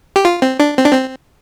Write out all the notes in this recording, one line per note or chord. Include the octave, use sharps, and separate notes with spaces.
G4
F4
C4
D4
C4
D4
C4